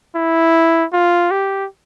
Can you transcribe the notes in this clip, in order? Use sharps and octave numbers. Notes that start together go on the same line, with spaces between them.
E4
F4
G4